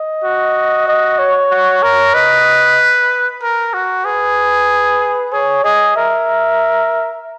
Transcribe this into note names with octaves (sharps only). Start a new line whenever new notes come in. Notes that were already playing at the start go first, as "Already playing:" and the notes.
Already playing: D#5
F#4
D#5
C#5
F#4
A#4
B4 D#5
A#4
F#4
G#4 B4
G#4 C#5
G#4 D#5
A#4 E5